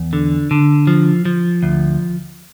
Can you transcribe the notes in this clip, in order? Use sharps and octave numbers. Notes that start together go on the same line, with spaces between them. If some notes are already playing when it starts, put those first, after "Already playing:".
Already playing: E2
D3
D3
F3
F3
D2